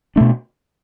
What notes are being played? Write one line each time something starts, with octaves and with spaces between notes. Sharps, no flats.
B2 A3 D4